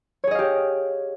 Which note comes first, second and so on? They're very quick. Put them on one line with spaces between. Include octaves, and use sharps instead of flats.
C#5 G#4 D#5 F5 G4